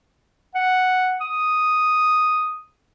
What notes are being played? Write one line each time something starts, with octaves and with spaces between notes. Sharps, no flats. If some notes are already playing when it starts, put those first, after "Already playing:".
F#5
D#6